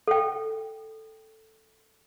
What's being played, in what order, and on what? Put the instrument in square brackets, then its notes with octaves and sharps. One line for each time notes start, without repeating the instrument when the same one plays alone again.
[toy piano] A4 G5